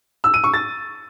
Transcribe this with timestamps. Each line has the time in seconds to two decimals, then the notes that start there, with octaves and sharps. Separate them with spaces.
0.24 E6
0.34 D#7
0.44 C#6
0.54 A6